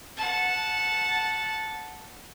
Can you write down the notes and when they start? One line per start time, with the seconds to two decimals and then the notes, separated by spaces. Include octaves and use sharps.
0.17 F#5 A5